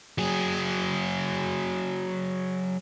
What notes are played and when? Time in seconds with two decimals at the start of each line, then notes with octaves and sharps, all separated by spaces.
0.18 F#3 G#4